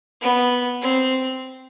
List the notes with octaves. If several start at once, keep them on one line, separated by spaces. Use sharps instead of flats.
B3
C4